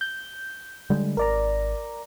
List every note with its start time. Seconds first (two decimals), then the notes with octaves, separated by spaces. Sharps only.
0.01 G6
0.90 D3 G3 G#3
1.17 G#1 A#4 D5 A#5